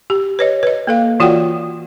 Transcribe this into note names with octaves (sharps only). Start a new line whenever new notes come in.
G4
B4 C#5 D#5
B4 D#5
A#3 A4 F5
E3 F4 F#4 D5 F#5 G5